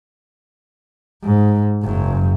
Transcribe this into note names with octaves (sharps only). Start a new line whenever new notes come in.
G#2
F#1 F#2